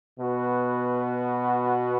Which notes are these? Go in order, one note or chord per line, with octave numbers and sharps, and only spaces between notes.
B2 B3 F#4 B4